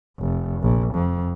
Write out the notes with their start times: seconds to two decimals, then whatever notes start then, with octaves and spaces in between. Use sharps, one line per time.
0.19 F1
0.63 A#1
0.95 F2